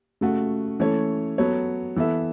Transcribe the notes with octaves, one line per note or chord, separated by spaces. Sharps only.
C#3 A3 F#4
E3 A3 C#4 A4 C#5
F#3 B3 A4 C#5
E3 B3 A4 E5